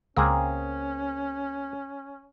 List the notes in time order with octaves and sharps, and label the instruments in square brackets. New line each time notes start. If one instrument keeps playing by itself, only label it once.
[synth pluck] C#2 C#3 D#6 [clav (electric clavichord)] A#3 C4 G#4 [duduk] C#4